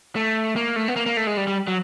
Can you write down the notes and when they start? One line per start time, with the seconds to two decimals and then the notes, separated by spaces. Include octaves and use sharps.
0.16 A3
0.56 A#3
0.76 A3
0.88 B3
0.96 A#3
1.06 A#3
1.17 A3
1.27 G#3
1.37 G3
1.47 G3
1.67 F#3